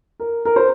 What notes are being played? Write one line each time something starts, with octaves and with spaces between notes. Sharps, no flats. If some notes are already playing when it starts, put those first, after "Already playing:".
A#4
A#4
C5